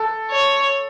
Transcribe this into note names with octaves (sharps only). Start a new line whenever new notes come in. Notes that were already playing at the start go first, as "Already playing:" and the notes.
Already playing: A4
C#5